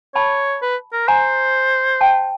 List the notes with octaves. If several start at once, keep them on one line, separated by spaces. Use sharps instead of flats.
C#5 A5 B5
B4
A#4
C5 G#5 A#5
G5 A5